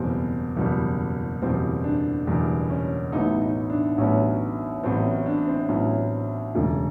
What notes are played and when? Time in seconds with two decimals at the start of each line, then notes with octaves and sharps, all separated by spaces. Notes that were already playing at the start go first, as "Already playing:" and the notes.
Already playing: F#1 E2 B2 G3 C4
0.57 F#1 E2 B2 G3
1.42 F#1 E2 B2 G3 C4
1.84 D4
2.27 F#1 E2 B2 G3 D4
2.70 C#4
3.12 A1 A2 F#3 B3 D#4
3.42 D#4
3.70 D4
3.98 A1 A2 F#3 B3 C#4
4.83 A1 A2 F#3 B3 C4
5.05 C#4
5.26 D4
5.47 C4
5.68 A1 A2 F#3 B3 C#4
6.55 E1 D2 C#3